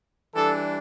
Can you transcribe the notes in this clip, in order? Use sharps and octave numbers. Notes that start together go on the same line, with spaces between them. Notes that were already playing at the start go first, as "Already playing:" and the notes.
E3 G3 D4 A4